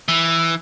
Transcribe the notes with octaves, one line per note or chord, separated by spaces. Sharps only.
E3